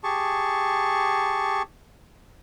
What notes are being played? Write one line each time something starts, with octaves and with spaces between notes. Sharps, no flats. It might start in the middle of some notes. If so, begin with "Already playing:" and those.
G4 G#4 A5 C#6